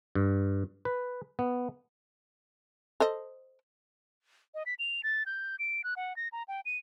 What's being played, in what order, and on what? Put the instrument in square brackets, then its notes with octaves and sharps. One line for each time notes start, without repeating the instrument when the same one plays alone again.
[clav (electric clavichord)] G2
B4
B3
[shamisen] A4 C5 D#5
[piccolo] D#5
B6
F7
A6
G6
D7
F#6
F#5
A#6
A#5
G5
D#7